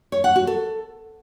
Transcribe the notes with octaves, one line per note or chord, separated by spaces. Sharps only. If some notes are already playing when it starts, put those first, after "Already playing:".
C#5
F#5
F#4
A4